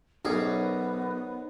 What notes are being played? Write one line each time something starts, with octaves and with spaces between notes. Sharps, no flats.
B1 F#2 B3 D#4 G#4 A#4 C5 C#5